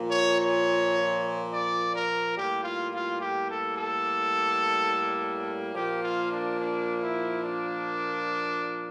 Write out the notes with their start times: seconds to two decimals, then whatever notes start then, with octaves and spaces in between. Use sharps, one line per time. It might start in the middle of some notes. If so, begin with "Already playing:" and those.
Already playing: A#2 F3 A#3
0.11 C#5
0.40 C#5
1.52 D5
1.95 A#4
2.36 A2 G3 A#3 G4
2.64 F4
2.92 F4
3.20 G4
3.49 A4
3.76 A4
5.73 A#2 F3 A#3 G4
6.02 F4
6.30 D4
6.58 D4
7.01 E4
7.43 D4